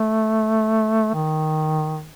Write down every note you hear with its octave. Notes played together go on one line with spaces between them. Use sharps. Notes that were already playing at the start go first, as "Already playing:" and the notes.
Already playing: A3
D#3